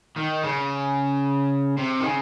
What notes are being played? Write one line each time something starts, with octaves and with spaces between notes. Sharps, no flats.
D#3
C#3
C3
D#3
C#3